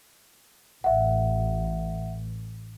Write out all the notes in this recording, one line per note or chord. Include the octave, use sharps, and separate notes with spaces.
A1 E5 F#5